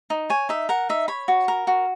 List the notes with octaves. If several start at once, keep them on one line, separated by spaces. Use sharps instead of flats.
D#4
C#5 G#5
D#4 E5
A#4 F#5
D#4 E5
C#5 B5
F#4
A#4
F#4